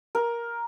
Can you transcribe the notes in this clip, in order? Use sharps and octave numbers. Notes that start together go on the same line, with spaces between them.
A#4